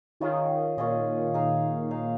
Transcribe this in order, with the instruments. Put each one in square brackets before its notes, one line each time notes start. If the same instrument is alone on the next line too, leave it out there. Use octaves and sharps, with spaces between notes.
[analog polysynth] D#3 [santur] C#4 F4 G#4 D#5
[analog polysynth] A#2 [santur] C#4 F4 G#4 D#5
[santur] D#4 G#4 F5
D#4 G#4 F5